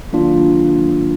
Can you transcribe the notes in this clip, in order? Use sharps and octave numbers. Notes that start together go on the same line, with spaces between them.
D#3 F#3 A#3 D4 F4